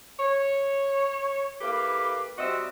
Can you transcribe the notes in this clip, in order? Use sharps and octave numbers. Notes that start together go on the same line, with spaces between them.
C#5
A#3 E4 G4 A4 B4
G3 C4 F#4 D#5 E5